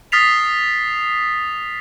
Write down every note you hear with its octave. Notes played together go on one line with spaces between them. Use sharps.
D#6 F6 A6 B6 C7 F7